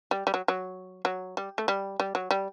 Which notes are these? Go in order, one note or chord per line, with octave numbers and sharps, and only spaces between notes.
G3
G3
F#3
F#3
F#3
G3
A3
G3
G3
F#3
G3